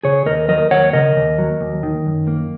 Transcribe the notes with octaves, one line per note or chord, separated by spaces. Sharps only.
C#3 G#4 C#5
D#2 A#4 D#5
F#3 A#4 D#5
D#2 C#5 F#5
C#3 A#4 D#5
D#2
F#3
D#2
D#3
F#2
A#3